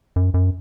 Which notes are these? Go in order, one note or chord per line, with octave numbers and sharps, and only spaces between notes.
F#2
F#2